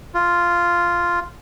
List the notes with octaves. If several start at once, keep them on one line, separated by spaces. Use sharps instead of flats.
F4